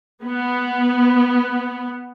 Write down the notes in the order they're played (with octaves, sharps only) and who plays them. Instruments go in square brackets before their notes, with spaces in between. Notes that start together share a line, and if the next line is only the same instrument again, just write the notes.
[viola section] B3